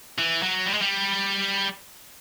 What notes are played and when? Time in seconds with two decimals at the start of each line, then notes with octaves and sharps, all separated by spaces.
0.18 E3
0.43 F#3
0.66 G3
0.74 G#3
0.82 G3